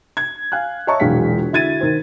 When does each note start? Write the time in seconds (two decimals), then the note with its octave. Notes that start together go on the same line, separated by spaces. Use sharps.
0.17 G#6
0.52 F5 G#5 F#6
0.87 C#5 D#5 E5 A5 A#5 C#6
1.00 E1 A#1 F#3 G#3 F5 B6
1.53 D3 E4 F#4 G#6 A6 D#7
1.81 D#3 C5